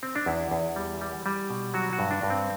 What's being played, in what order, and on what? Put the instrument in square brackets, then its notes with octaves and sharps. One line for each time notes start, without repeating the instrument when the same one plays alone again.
[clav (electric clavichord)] C4
D4
E2 E4
E2
G3
G3
G3
B2
F#3 F#4
F#4
G2
D4
G2
C4